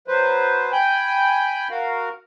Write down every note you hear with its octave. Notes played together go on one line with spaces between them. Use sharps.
F#3 B4 C5
G5 G#5 B5 G6
F#4 A#4 F5